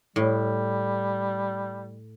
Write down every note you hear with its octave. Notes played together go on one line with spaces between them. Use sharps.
A2 G3